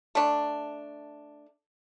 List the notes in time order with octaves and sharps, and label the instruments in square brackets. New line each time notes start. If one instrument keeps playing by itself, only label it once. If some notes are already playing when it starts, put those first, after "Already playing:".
[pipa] A3 D4